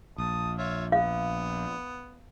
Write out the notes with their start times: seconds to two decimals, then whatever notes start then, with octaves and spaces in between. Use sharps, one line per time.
0.18 A#1 A5 D#6
0.58 F4 C#5 E5
0.92 B3 F5